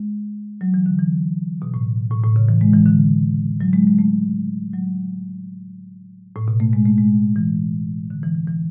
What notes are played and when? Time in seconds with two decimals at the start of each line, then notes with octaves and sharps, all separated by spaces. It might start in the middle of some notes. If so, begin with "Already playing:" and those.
Already playing: G#3
0.61 F#3
0.74 E3
0.86 D3
0.99 E3
1.62 B2
1.74 A2
2.11 A2
2.24 A2
2.36 C#3
2.48 E3
2.61 G#3
2.74 E3
2.86 D3
3.61 F#3
3.73 G#3
3.87 G#3
3.99 A3
4.74 F#3
6.36 A2
6.48 B2
6.60 A3
6.73 G#3
6.85 A3
6.98 G#3
7.36 E3
8.10 D3
8.23 E3
8.35 E3
8.47 E3